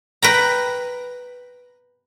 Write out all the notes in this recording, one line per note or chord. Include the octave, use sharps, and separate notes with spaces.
B4 G5 A#5